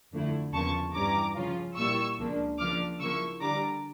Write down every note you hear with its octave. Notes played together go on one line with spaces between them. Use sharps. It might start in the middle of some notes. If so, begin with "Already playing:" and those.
F2 D3 A3 E4
E2 C#3 F3 A#3 A5 C#6
G2 E3 G3 C#4 A#5 D6
C#2 C#3 F3 C#4 F4
A#2 G3 A#3 E4 C#6 E6
C#2 C#3 F3 A#3 D4
C#2 C#3 F3 A#3 D4 D6 F6
C#3 F3 A#3 E4 C#6 E6
D3 G3 D4 A#5 D6